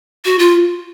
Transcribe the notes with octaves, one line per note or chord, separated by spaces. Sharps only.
F#4
F4